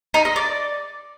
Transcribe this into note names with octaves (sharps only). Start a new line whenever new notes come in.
D#4
D#5
D5